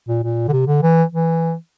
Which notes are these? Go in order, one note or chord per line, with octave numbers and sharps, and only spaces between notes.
A#2
A#2
D3
C3
D3
E3
E3